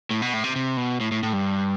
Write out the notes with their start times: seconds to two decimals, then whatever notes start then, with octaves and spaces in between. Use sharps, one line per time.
0.11 A2
0.22 B2
0.34 A2
0.44 C3
0.56 C3
0.77 B2
1.00 A2
1.12 A2
1.23 A2
1.33 G2